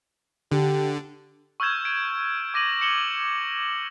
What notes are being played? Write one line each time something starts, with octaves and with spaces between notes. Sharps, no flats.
D3 G4
C#6 E6 F6 G6 G#6 E7
D7
D6 A#6 D#7 F#7
C#7 E7 F#7 G7